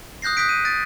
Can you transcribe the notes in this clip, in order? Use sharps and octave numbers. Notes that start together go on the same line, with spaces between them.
D#6 F#6 G6 A#6 C7
D#6 F#6 G6 B6 D7
D#7
F#6 A6 D7